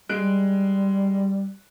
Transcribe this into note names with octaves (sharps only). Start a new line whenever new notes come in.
G3 G#3 F#6 D7